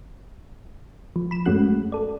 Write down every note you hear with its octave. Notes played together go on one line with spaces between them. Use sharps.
F3
B5 E7
F#2 G#3 A3 C#4 F#4 F#6
A4 D5